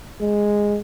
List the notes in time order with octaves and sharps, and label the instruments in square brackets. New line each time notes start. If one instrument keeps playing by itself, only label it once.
[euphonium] G#3